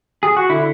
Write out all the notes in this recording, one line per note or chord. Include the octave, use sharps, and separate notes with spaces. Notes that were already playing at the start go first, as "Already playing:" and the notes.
G#4
F#4
D3 E4